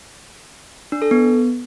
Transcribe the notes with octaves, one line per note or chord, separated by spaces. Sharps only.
D4
A4
B3